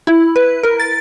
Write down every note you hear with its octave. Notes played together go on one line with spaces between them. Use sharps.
E4
B4
A#4
A6